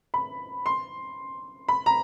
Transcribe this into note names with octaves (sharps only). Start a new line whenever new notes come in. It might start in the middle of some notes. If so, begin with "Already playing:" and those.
B5
C6
B5
A#5